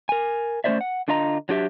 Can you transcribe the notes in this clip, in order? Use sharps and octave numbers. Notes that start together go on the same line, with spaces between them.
A#4 G#5
A3 C#4 E4 C5 D5 E5
F#5
D3 D4 F4 D#5 A#5
F#3 D4 G4 E5